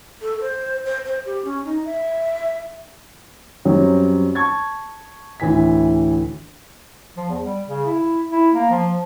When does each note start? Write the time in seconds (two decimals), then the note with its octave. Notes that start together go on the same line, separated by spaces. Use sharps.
0.22 A4
0.41 C5
0.85 C5
1.05 C5
1.26 G4
1.45 C#4
1.65 D#4
1.85 E5
3.65 F#2 F#3 G3 C4 C#4
4.35 A5 C#6 G#6 A6
5.40 D2 A2 E3 G#5 B6
7.17 F3
7.29 E2
7.43 G3
7.69 C#3
7.85 E4
8.30 E4
8.53 A#3
8.71 F3